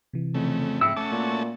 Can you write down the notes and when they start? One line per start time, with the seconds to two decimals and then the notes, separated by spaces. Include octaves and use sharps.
0.13 C3 E3
0.34 F2 C#3 A3
0.81 G#2 C4 E4 E5 E6 C#7
0.97 A3 C#4 F#4 A5 D6
1.11 A#2